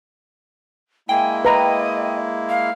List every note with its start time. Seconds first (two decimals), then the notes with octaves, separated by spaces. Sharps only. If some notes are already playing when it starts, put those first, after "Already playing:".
1.09 G#3 A#3 E4 G5 G#5
1.45 B4 D#5 A#5
2.49 F5